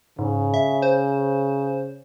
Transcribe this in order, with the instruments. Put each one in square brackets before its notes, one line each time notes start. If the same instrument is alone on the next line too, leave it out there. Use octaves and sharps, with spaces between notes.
[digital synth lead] G#2 [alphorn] C#3
[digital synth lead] E5
C5